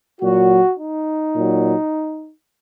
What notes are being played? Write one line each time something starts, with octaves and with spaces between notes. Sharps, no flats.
A#2 F#3 F#4
D#4
A#2 F#3